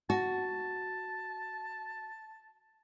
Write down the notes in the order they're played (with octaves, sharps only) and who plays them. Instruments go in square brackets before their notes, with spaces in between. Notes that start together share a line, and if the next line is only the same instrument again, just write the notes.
[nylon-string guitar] F#4 [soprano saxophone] A5